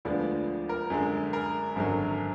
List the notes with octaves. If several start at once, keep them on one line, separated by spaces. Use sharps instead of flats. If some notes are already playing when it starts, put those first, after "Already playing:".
D2 D3 F3 G#3 B3 D5
A#4
F#2 D3 G#3
A#4
G#1 F#2 D3 F#3